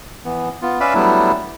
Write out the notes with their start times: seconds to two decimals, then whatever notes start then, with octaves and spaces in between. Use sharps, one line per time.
0.25 E3 B3
0.62 B3 F4
0.80 C#4 B4 D5 E5 F5 B5
0.94 F#3 G3 A3 B3 D4 E4